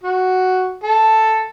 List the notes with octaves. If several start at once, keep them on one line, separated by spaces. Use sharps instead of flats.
F#4
A4